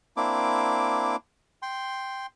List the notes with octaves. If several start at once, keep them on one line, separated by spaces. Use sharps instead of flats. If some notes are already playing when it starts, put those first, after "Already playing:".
A#3 C4 D4 E4 D6
G5 C6